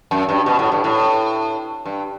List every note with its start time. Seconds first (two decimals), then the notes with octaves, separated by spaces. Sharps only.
0.11 F#2
0.29 G2
0.46 B2
0.59 A2
0.72 G2
0.84 A2
1.86 G2